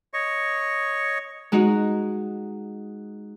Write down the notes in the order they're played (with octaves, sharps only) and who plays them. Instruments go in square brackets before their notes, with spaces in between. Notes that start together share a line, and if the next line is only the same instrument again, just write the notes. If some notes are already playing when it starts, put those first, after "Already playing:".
[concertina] C#5 D#5 C#6
[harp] G#3 D#4 F#4